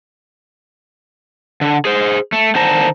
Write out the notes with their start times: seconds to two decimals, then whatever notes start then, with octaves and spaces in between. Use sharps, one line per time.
1.61 D3
1.85 G#4 C5
2.32 A3
2.55 D3 D#3 C5 A5 A#5